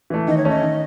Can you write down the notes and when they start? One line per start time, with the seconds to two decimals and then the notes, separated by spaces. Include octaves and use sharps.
0.10 E3 A3
0.28 D#3 D#5
0.37 C#5
0.45 A3 C#4 D#5
0.62 D#3